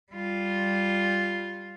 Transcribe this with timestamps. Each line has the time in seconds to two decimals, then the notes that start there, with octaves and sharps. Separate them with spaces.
0.12 G3 F4